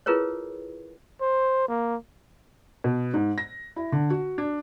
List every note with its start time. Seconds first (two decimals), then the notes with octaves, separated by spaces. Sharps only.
0.06 E4 F4 G#4 A#4 B4 C#5
1.21 C5
1.68 A#3
2.84 B2
3.14 G#2
3.38 A#6
3.76 E4
3.92 D3
4.10 F#4
4.38 D4